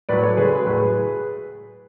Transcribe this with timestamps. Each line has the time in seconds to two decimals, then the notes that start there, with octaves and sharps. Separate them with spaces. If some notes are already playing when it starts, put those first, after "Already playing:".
0.09 A2 F#3 B4 D5
0.23 A4 C#5
0.37 C#3 G#3 G#4 B4
0.66 A2 F#3 G#4 B4